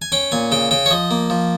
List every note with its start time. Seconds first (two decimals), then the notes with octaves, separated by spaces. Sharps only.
0.02 G#5
0.12 C#4 G5
0.32 A#2 G#5
0.52 C#3 G5
0.71 C#3 G5
0.86 C#5
0.91 F3 D#5
1.11 A#3
1.30 F3